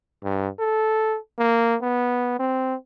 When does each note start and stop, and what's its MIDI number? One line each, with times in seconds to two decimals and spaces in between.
0.23 0.48 43
0.59 1.17 69
1.39 1.76 58
1.82 2.36 59
2.39 2.75 60